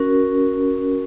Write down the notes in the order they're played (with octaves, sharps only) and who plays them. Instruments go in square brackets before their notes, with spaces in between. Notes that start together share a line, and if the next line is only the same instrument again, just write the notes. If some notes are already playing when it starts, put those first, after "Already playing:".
Already playing: [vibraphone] C#4 F#4 A#4